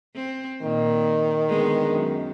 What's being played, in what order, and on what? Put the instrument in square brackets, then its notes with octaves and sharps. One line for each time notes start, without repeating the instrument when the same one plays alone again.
[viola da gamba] C4
[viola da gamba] A#2 [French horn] D#3
[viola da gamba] D3 G#3 B3
F#2